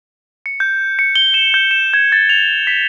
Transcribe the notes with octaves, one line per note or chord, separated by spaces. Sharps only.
C#7
G6
C#7
G7
E7
G6
E7
G#6
A6
F7
B6